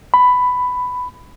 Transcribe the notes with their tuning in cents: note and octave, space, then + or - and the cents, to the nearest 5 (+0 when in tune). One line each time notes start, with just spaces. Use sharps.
B5 +10